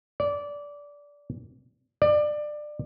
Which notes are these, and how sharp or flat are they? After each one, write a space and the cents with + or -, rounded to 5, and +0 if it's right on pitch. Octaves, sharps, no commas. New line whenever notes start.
D5 -20
D5 +20